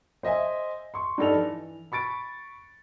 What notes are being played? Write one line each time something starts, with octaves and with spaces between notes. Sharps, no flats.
C5 D#5 E5 G#5
C6 C#6
G2 D4 D#4 A4 D5 F7
E3
B5 C#6 A6 D7